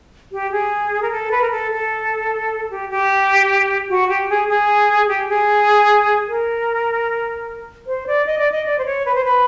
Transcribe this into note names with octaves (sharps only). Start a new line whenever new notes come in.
G4
G#4
A#4
A4
B4
A#4
A4
A4
G4
G4
F#4
G4
G#4
G#4
G4
G#4
A#4
C5
D5
D#5
D5
D#5
D5
C5
C#5
B4
C5
B4